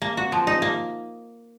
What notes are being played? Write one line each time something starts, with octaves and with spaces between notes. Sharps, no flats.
A#3
F#4
F3
D#4
A#3